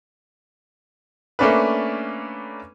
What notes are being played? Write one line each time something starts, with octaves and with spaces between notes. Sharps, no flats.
A3 A#3 C#4 D4 B4